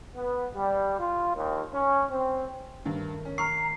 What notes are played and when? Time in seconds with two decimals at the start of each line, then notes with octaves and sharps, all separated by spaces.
0.15 B3
0.54 G3
0.99 F4
1.36 D#2
1.73 C#4
2.11 C4
2.85 G2 D#3 A3
3.25 C#4
3.38 A#5 C#6 F6 C7